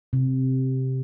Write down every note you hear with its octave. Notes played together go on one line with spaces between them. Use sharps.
C3